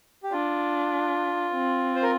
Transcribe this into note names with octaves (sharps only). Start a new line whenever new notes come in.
G4
D4 F4
C4
C5
A#4